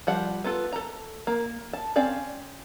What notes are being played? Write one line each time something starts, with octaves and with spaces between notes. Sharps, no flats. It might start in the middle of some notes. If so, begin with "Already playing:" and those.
F3 G3 F#5
B3 F4 A4
A4 A#5
A#3
A5
C4 C#4 D5 F5